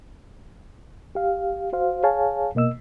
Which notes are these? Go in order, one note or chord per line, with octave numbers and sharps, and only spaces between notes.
G4 F5
F#4 C5 F5
G#4 C#5 F5 G#5 A5
B2 A#3 D#5 E6